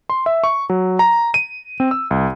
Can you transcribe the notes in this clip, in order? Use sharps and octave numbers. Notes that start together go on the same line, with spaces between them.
C6
E5
C#6
F#3
A#5
D#7
C4
E6
C2